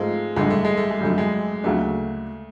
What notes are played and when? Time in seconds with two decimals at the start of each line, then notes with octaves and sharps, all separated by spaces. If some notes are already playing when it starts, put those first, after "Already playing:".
Already playing: G#2 F3 G#3 A3 C4 F4
0.36 A1 G2 D3 G#3
0.50 A3
0.65 G#3
0.77 A3
0.91 G#3
1.01 G#1 F#2 D3 G3 A3
1.18 G#3
1.64 D2 C#3 F#3 A3 A#3 D4